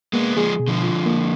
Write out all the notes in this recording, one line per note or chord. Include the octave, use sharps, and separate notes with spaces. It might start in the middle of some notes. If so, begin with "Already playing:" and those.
G#3 A#3 B3
F3 G#3 G#4
B2
D3 F3
F4
A#3